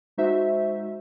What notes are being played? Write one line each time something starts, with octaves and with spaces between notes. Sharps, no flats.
G#3 D#4 F#4 C5 E5